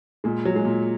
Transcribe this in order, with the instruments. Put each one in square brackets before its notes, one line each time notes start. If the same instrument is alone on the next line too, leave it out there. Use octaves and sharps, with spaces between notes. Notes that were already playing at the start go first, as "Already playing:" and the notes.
[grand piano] A#2 [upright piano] G#3
[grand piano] F#3
[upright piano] G#3
[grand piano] A#2